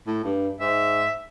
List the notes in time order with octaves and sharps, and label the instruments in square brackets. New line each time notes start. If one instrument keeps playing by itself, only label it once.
[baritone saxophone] A2
G2
[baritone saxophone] G#2 [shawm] E5